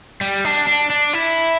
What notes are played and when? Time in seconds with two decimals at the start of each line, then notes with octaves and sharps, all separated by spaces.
0.21 G3
0.45 D4
0.67 D4
0.90 D4
1.13 E4